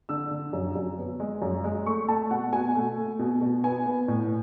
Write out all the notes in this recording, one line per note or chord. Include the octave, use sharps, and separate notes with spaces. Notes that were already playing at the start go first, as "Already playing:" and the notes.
D3 E6
D3
F#2
F#2
B3
G#3
F#2
G#3
A3 C#6
A3 A5
B2 F#5
B2 G#5
A3
A3
B2
B2
B3 G#5
B3
A2